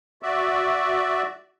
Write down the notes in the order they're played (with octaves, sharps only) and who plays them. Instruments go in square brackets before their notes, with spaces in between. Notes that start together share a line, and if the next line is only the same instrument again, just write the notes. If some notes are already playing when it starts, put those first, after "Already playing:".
[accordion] F#4 D5 E5